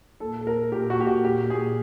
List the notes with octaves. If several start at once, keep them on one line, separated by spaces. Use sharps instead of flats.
A#2 A4
A4
A#2 A#4
A#2 G4
F#4
A#2 G4
F#4
A#2 G4
A#2 G#4